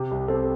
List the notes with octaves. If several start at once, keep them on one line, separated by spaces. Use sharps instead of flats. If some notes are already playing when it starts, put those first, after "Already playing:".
Already playing: C3 G4
C2
C4 A4